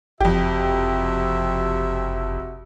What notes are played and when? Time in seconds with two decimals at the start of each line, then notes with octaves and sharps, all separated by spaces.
0.20 F#1 F2 C3 F#4 G4 E5